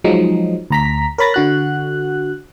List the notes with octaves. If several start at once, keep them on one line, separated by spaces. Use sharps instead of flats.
F3 F#3 G#3 D#4
D2 A#5 B6
A#4 C#5 B5 A6 A#6
D3 F#4 F#6